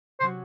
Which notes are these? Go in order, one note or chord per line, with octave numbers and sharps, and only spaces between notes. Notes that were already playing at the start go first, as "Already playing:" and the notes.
C3 F#3 C#4 F#4 C5